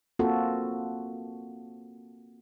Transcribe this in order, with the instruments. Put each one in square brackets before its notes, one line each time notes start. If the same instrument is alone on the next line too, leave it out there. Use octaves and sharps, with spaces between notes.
[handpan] A#3 C4 F4 F#4 A4